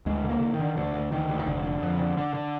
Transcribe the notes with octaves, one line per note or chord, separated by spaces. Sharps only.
D2 G#3
D3
A#3
D3
D#3
D3
D2 D3
D2
D2 D#3
D2
D#3
F1 D3
D3
F2
D3
D3
D3